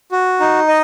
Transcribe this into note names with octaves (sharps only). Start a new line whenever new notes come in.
F#4
D#4
D#5